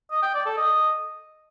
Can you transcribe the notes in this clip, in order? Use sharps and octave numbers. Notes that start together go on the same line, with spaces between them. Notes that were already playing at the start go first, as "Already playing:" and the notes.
D#5
G5
D5
A4
D#5